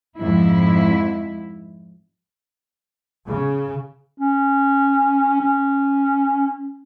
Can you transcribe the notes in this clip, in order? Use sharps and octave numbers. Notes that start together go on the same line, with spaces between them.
F2 G#2 E4
C#3
C#4
C#4